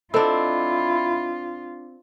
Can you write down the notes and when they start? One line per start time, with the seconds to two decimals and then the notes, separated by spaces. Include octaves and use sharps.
0.14 C4 D4 E4 F4 A4 D#5